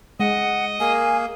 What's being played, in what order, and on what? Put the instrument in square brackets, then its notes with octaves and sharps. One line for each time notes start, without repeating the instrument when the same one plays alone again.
[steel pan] G#3 [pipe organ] D#5 [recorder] F#5
[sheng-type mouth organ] A#3 G#4 [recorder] G#5